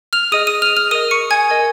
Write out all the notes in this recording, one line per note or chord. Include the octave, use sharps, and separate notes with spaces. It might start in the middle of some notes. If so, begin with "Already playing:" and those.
F6 F7
G#4 D#5 D#6 D#7
D#6 D#7
F6 F7
F6 F7
A#4 D#5 D#6 D#7
C#6 C#7
G#5 G#6
A#4 D#5